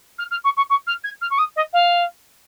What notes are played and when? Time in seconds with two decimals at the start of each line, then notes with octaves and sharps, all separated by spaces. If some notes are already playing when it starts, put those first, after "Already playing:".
0.18 F6
0.31 F6
0.44 C#6
0.57 C#6
0.70 C#6
0.87 F6
1.04 G#6
1.21 F6
1.30 C#6
1.38 D#6
1.56 D#5
1.73 F5